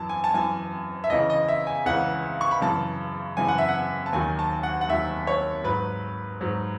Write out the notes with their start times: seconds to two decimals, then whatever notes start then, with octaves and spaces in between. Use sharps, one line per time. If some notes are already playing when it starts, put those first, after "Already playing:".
Already playing: F#2 E3 A5
0.09 G#5
0.24 A5
0.34 F#2 E3 G#5
1.04 E5
1.10 C#2 C#3 E3 D#5
1.30 D#5
1.48 E5
1.67 G#5
1.86 C#2 C#3 E3 F#5
2.41 C#6
2.51 B5
2.61 F#2 C#3 E3 A5
3.37 F#2 C#3 E3 G#5
3.48 F#5
3.58 E5
3.68 F#5
4.06 A5
4.13 D#2 D#3 F#3 G#5
4.39 A5
4.63 F#5
4.81 F#5
4.89 D#2 D#3 F#3 E5
5.27 C#5
5.64 G#2 F#3 B4
6.41 G#2 F#3